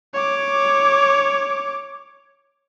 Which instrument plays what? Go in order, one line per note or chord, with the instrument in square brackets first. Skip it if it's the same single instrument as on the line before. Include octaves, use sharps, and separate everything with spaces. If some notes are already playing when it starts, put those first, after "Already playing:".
[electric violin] C#5 D6